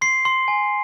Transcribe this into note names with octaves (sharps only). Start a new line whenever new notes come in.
C6 C7
C6
G#5